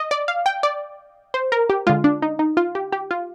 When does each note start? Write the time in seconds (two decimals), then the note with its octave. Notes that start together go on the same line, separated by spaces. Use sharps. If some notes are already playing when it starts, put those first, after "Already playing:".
Already playing: D#5
0.11 D5
0.28 F5
0.46 G5
0.63 D5
1.34 C5
1.52 A#4
1.70 G4
1.87 D3 G#3 F4
2.04 D4
2.22 D#4
2.39 D#4
2.57 F4
2.75 G4
2.92 G4
3.11 F4